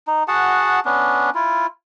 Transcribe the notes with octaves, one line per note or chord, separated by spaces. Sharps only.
D#4
F#4 G#4 F#5 A5
B3 C#4 D4
E4 F4